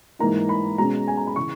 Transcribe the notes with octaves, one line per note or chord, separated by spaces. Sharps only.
G#2 E3 A#3 D#4 A#5
B5
B2 G#3 C#4 A#5
G#5
A#5
B5
C#3 E3 C#6